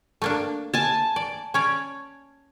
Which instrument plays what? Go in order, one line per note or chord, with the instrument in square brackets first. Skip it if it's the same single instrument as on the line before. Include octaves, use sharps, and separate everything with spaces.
[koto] A3 A#3 D4
[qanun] G#5 A5
[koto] D5
C#4 C#5 D5